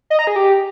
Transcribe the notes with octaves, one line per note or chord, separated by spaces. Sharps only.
D#5
A#5
G#4
G4